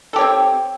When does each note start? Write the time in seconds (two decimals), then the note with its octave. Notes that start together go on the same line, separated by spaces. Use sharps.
0.13 A4
0.16 G4
0.18 C#5
0.21 C4